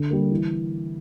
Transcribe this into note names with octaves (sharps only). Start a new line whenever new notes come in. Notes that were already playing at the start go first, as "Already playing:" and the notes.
Already playing: D3
G3 A#3
E3